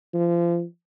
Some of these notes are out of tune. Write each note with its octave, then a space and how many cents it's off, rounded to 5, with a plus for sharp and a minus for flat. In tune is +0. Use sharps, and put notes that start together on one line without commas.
F3 -30